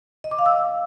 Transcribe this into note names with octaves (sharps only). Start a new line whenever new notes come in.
D#5
D6
F5
E6